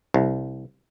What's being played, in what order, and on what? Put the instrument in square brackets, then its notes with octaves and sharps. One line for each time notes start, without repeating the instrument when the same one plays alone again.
[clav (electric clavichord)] C2